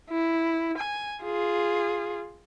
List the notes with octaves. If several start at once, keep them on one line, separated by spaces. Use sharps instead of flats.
E4
G#5
F4 G#4